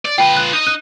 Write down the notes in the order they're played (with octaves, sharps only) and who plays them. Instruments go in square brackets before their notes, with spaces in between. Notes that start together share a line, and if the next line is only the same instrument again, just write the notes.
[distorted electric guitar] D5
[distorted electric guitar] F4 B4 [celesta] G5
[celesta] F#6
[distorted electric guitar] D#4 D#5
[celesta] F#6 D#7